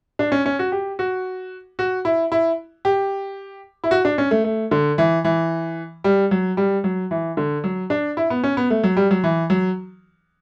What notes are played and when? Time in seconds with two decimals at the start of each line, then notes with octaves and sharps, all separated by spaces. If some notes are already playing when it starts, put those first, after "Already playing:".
0.19 D4
0.32 C#4
0.46 C#4
0.59 F#4
0.72 G4
0.99 F#4
1.79 F#4
2.05 E4
2.32 E4
2.85 G4
3.84 E4
3.91 F#4
4.05 D4
4.18 C#4
4.31 A3
4.44 A3
4.71 D3
4.98 E3
5.24 E3
6.04 G3
6.31 F#3
6.57 G3
6.84 F#3
7.11 E3
7.37 D3
7.64 F#3
7.90 D4
8.17 E4
8.30 B3
8.44 C#4
8.57 B3
8.70 A3
8.83 F#3
8.97 G3
9.11 F#3
9.24 E3
9.50 F#3